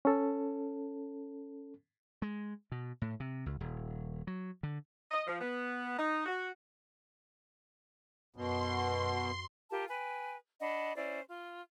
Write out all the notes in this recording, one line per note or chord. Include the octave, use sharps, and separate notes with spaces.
C#4 A4
G#3
B2
A2
C3
C#2
D#1
F#3
D3
D#5
F3
B3
D#4
F#4
F#2 B2 C6
F4 G4 A#4 A5
B4 G5 G#5
D4 D#5 F#5 B5
C#4 E4 C5 D5
F4